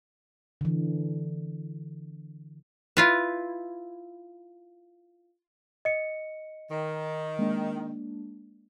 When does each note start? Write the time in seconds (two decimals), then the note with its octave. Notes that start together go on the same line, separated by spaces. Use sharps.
0.61 D3 E3
2.97 E4 F4 B4
5.85 D#5 C#7
6.71 D#3
7.39 G#3 A#3 D4